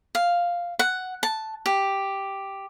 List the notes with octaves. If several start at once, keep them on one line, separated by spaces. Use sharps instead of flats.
F5
F#5
A5
G4